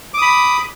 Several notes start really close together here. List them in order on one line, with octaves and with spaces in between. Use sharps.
D6 D#6 B5